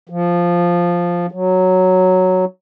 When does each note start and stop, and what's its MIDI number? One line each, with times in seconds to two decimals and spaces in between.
0.09 1.26 53
1.31 2.45 54